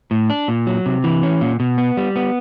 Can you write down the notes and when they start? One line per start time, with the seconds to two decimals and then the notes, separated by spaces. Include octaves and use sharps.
0.11 A2
0.30 D4
0.48 A#2
0.67 F#3
0.86 C3
1.04 E3
1.23 C#4
1.41 A#2
1.60 B2
1.78 B3
1.97 G3
2.16 B3